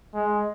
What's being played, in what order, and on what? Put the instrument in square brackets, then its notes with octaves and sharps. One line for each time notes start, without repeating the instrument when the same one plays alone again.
[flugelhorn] G#3